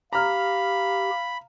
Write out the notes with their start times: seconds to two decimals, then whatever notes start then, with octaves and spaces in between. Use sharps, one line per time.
0.13 G4 F5 A#5 B5 F6